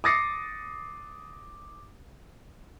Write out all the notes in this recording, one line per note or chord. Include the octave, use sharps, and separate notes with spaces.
D6 D#6 A6 A#6 C7 C#7